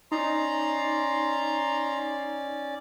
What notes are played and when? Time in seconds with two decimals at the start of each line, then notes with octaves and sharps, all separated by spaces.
0.12 C#4 D#4 D5 A#5 C6